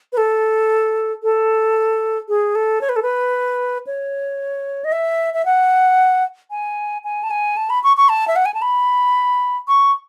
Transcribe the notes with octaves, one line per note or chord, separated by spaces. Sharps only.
B4
A4
A4
G#4
A4
C#5
B4
A4
B4
C#5
D#5
E5
E5
F#5
G#5
G#5
A5
G#5
A5
B5
C#6
C#6
A5
E5
F#5
G#5
A5
B5
C#6